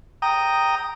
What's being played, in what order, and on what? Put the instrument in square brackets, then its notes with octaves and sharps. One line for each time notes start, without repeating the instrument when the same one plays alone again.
[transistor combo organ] G5 A#5 D#6